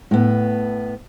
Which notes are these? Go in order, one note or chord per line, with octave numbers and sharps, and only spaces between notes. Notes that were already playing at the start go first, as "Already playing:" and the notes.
A2 B3